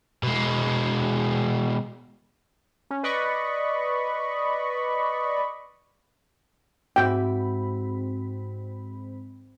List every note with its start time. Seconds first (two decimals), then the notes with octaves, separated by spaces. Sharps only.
0.23 B2 G#3
2.91 C#4
3.03 B4 D5 D#5 B5 C#6
6.96 G#2 C4 F#4 E5 G5 B5